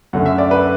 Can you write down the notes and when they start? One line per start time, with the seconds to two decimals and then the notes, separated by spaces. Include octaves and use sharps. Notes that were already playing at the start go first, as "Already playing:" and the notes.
0.13 F#2 D3 A3 F#5
0.26 E5
0.38 D5
0.51 B4